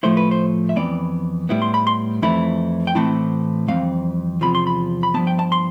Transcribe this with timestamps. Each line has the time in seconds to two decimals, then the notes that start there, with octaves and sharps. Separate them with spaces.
0.03 A2 F3 A3 E4 C5
0.17 B4
0.31 C5
0.69 E5
0.76 F2 E3 B3 D5
1.49 A2 G3 B3 E4
1.62 C6
1.74 B5
1.87 C6
2.22 F2 E3 A3 E4 B5
2.87 G5
2.95 A2 E3 A3 C4 E4 A5
3.68 F2 E3 G3 C4 F5
4.41 E2 C3 F3 B5
4.55 C6
4.67 B5
5.03 B5
5.14 G2 F3 B3 A5
5.27 G5
5.39 A5
5.52 C6